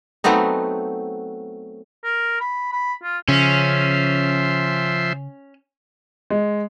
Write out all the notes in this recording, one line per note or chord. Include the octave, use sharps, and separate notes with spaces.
F#3 A3 B3 C4 D#4
A#4
B5
B5
F4
C#3 F3 C#4 E5 C6
G#3